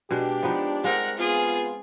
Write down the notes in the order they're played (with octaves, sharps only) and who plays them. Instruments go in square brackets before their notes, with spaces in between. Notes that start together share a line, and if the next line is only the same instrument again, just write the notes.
[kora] B2 G#3 [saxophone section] D4 [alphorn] G4
[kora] F3 B3 D#4
[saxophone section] G3 F#5 [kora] G#3 C4 [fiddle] A#4
[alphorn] B3 [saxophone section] F4 [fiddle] G#4